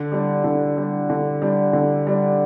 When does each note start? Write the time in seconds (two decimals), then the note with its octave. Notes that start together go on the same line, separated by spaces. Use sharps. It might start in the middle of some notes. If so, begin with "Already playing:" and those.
Already playing: D3
0.12 G3 D4
0.44 D3
0.77 G3 D4
1.10 D3
1.42 G3 D4
1.73 D3
2.07 G3 D4